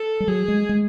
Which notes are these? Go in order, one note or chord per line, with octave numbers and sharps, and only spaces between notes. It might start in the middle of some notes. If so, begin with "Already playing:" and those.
Already playing: A4
G3
F#3 G#4
G#3
G#3